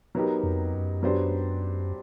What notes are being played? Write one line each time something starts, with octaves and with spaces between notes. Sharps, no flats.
F#3 B3 D#4 G4 A#4
F2
F#2
F#3 B3 D4 G4 C5